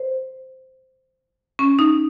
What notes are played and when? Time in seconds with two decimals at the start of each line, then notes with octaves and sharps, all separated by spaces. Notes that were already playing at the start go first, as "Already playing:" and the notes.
Already playing: C5
1.59 C#4
1.79 D#4